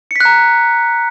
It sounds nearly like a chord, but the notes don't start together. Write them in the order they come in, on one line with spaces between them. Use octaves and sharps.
C#7 B6 F#6 A#5